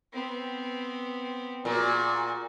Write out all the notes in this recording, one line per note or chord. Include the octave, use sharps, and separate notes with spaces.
B3 C4
A#2 F#4 G#4